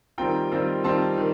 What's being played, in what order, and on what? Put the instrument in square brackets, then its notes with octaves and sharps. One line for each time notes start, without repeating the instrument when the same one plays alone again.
[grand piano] D#3 G3 C4 F4 G5 A#5
D#3 G3 C4 F4
D#3 G3 C4 F4 A5 C6
D#3